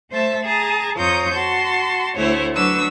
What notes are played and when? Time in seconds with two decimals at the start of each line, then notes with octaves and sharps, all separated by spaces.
0.11 A3 C5 E5 A5
0.45 G#4 A5 A#5
0.97 F2 F4 C#5 A#5 D#6 G6
1.33 F#4 A5 C6
2.16 D2 A3 E4 C5 C#5
2.54 F#3 D4 B4 C#6 E6